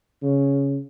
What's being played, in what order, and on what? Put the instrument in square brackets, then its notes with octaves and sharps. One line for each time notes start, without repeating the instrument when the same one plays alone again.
[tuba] C#3